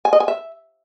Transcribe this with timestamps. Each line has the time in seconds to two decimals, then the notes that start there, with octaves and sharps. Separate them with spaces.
0.05 G#5
0.13 D#5
0.20 G#5
0.28 E5